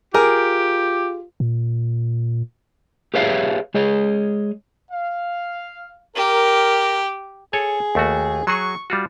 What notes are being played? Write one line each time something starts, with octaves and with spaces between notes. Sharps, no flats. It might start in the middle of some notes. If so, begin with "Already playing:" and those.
F4 G4 G#4 A#4
A#2
G4 G#4 B4 C#5 E5 F5
G#3 G#4 C#5 D#5
F5
G4 A#4
G#4 A4 C#5 G#5
D#2 A3 F#4
F#3 F#4 G#4 C#6
G3 F4 F#4